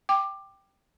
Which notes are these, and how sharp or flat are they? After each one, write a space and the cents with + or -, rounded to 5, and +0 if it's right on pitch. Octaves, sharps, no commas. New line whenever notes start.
G5 +0 D6 +15